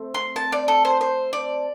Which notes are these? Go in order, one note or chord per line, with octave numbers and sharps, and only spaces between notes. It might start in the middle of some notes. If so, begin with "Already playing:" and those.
Already playing: A3 C4
C6
A5
D5
A4
C5
C5
D5